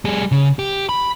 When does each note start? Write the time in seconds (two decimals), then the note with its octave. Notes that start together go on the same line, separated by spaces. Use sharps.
0.05 G3 G#4
0.32 C#3
0.59 G4
0.89 B5